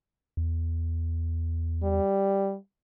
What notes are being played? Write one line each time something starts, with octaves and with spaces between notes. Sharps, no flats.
E2
G3